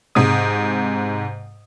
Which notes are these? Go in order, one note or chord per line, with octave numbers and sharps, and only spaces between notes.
G#2 C3 G#3 D#6